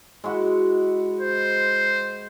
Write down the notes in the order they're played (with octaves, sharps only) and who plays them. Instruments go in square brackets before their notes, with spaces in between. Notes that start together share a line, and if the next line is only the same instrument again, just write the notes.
[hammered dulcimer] G#3 E4 F#4
[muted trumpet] C5